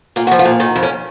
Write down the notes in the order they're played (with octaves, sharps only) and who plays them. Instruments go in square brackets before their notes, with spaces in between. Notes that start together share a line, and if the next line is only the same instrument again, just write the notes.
[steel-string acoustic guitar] A#2 F4
F#4
F3
F4
A#2
D#3 D#4
F2
C#4